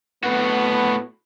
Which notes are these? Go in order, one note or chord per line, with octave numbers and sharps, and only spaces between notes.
A2 B3 F#4